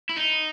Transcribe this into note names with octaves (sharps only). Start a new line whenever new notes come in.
E4
D#4